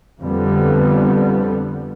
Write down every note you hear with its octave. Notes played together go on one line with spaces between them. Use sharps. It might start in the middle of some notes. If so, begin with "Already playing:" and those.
F2 D3 G3 B3